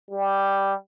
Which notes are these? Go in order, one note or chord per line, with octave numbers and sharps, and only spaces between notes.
G3